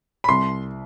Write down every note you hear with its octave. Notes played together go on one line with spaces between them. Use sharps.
B5
C2 C6